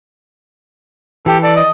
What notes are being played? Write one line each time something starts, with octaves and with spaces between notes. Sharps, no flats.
E3 G4 A4
A4 D5
D#5